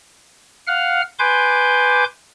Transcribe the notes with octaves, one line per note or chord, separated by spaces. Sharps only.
F5 F#5 F6
B4 G#5 C6 D6 G6